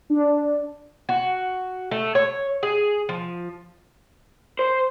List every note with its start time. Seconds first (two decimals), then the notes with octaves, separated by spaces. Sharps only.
0.10 D4
1.09 F#4
1.91 A3
2.15 C#5
2.63 G#4
3.09 F3
4.59 C5